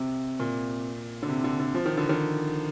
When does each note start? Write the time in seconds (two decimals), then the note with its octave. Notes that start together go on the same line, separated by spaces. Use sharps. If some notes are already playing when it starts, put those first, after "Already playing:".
Already playing: C3
0.40 A#2
1.22 D3
1.29 C3
1.44 D3
1.59 D3
1.74 F3
1.86 D#3
1.97 D3
2.09 D#3